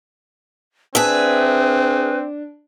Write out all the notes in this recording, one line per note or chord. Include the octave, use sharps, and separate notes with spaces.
C4 D4 G#4 B4 E5